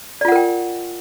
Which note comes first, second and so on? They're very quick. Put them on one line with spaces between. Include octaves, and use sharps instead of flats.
D5 F4 F#5 A#4 G5